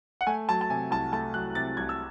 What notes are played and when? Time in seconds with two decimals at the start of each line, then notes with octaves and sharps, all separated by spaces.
0.21 F#5
0.27 A3 G#5
0.49 F#3 A5
0.61 A5
0.70 C3 G#5
0.91 C2 A5
1.12 A3 A5
1.34 F#3 F#6
1.55 C3 A6
1.77 C2 G#6
1.89 E6